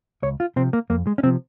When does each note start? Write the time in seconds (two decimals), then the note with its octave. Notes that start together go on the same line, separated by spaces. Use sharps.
0.22 C#2 C#5
0.40 F4
0.56 C3 F3 C4
0.73 A#3
0.90 F2 A#3
1.07 G#3
1.18 C#4
1.23 C3 F3 C4